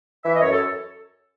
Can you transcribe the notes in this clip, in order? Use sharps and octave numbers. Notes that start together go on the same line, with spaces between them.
E3 E5
D#5
F#2 C#5
A4